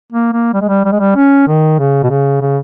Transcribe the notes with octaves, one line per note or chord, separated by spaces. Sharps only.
A#3
A#3
G3
G#3
G3
G3
G#3
G3
C#4
D#3
C#3
B2
C#3
C#3